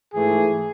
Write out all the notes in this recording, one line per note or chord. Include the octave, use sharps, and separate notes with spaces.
G#2 E3 A3 G#4